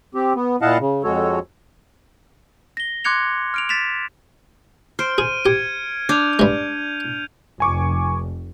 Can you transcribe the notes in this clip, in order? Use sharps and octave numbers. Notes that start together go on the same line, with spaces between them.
C4 G4
B3
A#2 E4 D#5 F5 F#5 A5
C#3
F2 G#3 F#4 A4 C#5
A#6 G7
C6 D6 F#6 G#6 C#7 F7
F6 D7 F7
A6 B6 E7 F7
C5 F6 D7
G#4 D#7
G4 G#6 C#7 D7
D4 G6 F7
G2 G#3
F1 G#5 C#6 D6